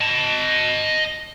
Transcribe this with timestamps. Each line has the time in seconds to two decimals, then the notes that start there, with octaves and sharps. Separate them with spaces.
0.01 D#5 A5